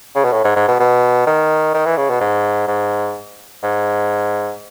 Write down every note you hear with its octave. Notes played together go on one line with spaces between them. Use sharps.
C#3
B2
A2
G#2
G#2
B2
B2
D#3
D#3
E3
C#3
B2
G#2
G#2
G#2